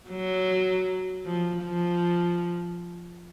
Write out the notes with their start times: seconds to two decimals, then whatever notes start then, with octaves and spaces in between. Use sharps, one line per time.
0.09 F#3
1.25 F3
1.63 F3